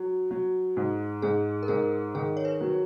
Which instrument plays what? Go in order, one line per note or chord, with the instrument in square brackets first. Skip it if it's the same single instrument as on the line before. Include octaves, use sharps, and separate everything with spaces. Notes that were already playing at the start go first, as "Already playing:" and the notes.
Already playing: [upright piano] F#3
F#3
G#2
[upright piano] G#2 [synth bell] G#4
[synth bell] A#4
[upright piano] G#2 [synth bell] G#4
[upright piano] D#3 [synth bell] G#4
[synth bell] C#5
B4
[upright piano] F#3